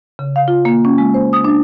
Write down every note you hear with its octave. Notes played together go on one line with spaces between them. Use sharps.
C#3
F5
F4
A#3
C#4
G#3
C5
D#6
D4